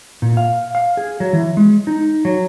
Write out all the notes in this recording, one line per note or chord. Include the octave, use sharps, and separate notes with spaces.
A#2
F5
F5
G#4
F#3
E3
G#3
D#4
F#3